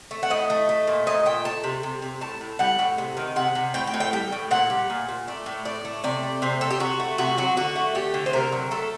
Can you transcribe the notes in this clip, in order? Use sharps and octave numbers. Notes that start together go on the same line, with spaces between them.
A3
F#5
A2 D#5
A3
A3
A#2
A#2 D#5
A3 G5
A3 A5
C3
C3
C3
A2 A5
A2
G3 F#5
A2
C3
D#3
C3 F#5
C3
A2 G5
G5
A2
G5
G3 G5
A2
A#2 F#5
G3
A#2
A#2
A3 D5
A2
A2 D5
A3
C3 D5
A3
C3 C5
C3 A4
G4
C3 F#4
A3
C3 F#4
F#3 F#4
D3 F#4
A3
A3 G4
D3
C5
C3 A#4
F#3
A3 A4